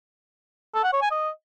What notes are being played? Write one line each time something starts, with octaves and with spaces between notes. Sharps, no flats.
A4
F#5
C#5
G#5
D#5